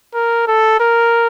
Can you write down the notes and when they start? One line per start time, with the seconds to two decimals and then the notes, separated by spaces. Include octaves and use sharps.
0.15 A#4
0.47 A4
0.80 A#4